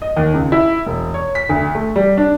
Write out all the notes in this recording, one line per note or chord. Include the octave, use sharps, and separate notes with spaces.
D#5
D#2
C#2
E4
E1
C#5
B6
D2
A3
G3
D4